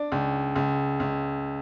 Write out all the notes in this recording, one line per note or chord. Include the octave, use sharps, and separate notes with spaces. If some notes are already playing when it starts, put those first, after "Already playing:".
Already playing: D4
C#2
C#2
C#2